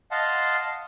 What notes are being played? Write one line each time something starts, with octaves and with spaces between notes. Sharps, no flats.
D#5 F5 F#5 A5 C6